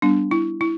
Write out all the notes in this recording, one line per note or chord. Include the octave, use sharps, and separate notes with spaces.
G3 B3 D4
E4
E4